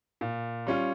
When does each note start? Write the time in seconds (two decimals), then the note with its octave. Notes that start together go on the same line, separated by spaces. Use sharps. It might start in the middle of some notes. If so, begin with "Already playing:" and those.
0.21 A#2
0.67 G3 C#4 F4